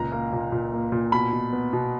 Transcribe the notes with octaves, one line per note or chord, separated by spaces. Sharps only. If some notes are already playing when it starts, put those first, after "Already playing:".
Already playing: C#2 A#2 A#5
A#3
A#2
A#2
A#3
A#2
B2 B5
B2
B3
B2